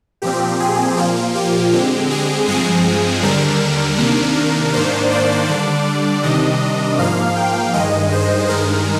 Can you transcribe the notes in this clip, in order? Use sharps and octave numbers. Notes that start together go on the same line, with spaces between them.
A#2 F3 C4 G4
G#4
A#2 F3 A#3 F4
G4
D3 G#3 C4 G4
G#4
G2 F3 G#3 C4 G#4
D#2 D3 G3 D4 A#4
C3 D#3 A#3 D4
G#2 D#3 A#3 D4 C5
D5
D3 G3 D4
C3 D#3 G3 D4 D#5
G#2 F3 A#3 F5
G5
G2 D#3 G#3 D#5
C5
G2 D#3 G#3 A#4